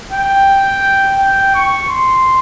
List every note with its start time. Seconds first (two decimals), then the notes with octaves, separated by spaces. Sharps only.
0.12 G5
1.19 G5
1.55 C#6
1.89 C6